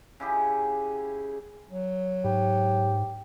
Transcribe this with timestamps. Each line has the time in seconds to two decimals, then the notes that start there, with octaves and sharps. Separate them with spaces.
0.20 C#3 E4 G4 G#4
1.71 F#3
2.24 G#2 G4